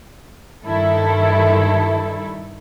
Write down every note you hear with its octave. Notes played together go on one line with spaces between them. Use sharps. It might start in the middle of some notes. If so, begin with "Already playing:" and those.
G2 D#3 E4 A4